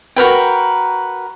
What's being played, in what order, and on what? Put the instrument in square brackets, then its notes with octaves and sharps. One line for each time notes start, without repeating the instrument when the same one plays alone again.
[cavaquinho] F#4 A#4 B4 G5